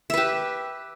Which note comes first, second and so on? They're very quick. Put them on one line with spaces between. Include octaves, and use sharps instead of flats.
E5 B4 G4